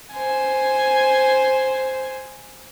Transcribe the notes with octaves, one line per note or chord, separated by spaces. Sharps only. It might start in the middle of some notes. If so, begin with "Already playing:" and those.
C5 G#5